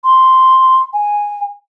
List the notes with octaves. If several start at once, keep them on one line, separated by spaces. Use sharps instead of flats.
C6
G#5